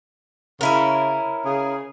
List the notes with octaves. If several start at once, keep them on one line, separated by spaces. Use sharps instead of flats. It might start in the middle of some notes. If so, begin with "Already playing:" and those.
C#3 C#4 E4 A#4
C#3 G#4